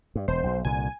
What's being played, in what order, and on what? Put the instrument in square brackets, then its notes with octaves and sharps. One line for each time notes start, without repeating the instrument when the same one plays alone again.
[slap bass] G2
[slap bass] E1 [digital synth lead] C5
[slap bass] B1 B2
[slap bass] C2 A#2 D3 [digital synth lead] G#5